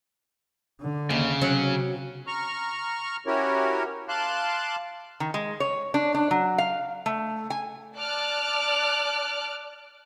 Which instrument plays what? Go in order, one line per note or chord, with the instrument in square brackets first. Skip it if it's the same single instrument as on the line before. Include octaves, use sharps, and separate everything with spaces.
[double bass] D3
[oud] D#2 [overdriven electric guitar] C#3
[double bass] C3 [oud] F#3 C#4
[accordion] A#5 C#6 F6
C#4 E4 F#4 G4 A#4 C#5
F5 A5 C6 D6 F#6
[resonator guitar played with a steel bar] D#3
G#3
C#5
D4
D4
F#3
F5
A3
G#5
[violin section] D5 A5 D6 F6 F#6